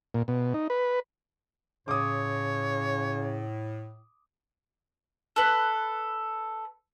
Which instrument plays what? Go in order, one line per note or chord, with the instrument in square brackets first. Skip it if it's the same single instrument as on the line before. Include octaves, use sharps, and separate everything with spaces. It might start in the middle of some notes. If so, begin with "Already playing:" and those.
[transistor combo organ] A#2
B2
D#4
B4
[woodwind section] A2 [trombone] C#3 [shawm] C#5 [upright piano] D6 D#6
[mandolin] A4 B4